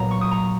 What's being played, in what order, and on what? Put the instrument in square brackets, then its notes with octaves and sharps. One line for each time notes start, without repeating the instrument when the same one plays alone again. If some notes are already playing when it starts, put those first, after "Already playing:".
Already playing: [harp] A#2 F#3 B3 A#5
C#6
D#6
A#5 C#6